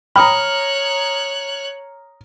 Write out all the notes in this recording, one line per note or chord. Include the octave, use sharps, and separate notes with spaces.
C#5 G5 A#5 B5 D#6 F6 F#6